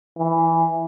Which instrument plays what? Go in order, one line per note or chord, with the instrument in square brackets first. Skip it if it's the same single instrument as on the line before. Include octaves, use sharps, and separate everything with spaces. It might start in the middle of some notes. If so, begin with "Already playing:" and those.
[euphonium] E3